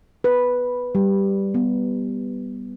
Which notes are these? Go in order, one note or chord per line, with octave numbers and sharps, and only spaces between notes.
B4
G3
B3